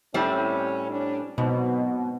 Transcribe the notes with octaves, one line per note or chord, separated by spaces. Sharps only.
A2 G3 C4 C#4
C#4 D4
G#2 B2 F#3 C4